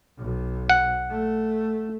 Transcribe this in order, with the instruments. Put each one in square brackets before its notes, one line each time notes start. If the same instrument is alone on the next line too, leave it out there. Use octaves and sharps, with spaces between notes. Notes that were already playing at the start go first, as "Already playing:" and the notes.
[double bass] B1
[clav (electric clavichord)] F#5
[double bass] A3